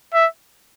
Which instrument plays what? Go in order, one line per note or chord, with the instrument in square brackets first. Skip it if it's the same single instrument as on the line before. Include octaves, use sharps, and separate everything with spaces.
[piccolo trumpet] E5